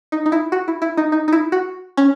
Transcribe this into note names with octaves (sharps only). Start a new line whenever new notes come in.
D#4
D#4
E4
F#4
E4
E4
D#4
D#4
D#4
E4
F#4
C#4